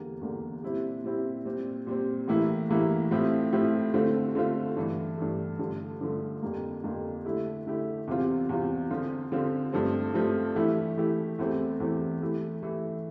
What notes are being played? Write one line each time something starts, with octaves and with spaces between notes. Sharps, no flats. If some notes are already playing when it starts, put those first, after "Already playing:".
Already playing: E2 D3 G3 A#3
E2 D3 G3 A#3
A#2 G3 C4 E4 G4
A#2 G3 C4 E4 G4
A#2 G3 C4
A#2 G3 C4
A2 E3 A#3 E4 G4
A2 E3 A#3 E4 G4
A2 F3 C4 E4 G4
A2 F3 C4 E4 G4
D3 A3 C4 F4
D3 A3 C4 F4
G2 E3 A3
G2 E3 A3
G2 D3 F3 A3
G2 D3 F3 A3
F2 D3 G3 A#3
F2 D3 G3 A#3
D3 A3 E4 G4
D3 A3 E4 G4
E2 C3 G3 C4 F4
E2 C3 G3 C4 F4
D3 F3 C4 F4
D3 F3 C4 F4
G2 F3 A3 C4
G2 F3 A3 C4
E3 A3 E4 G4
E3 A3 E4 G4
E2 E3 A3 C4 G4
E2 E3 A3 C4 G4
E3 A3 E4 G4
E3 A3 E4 G4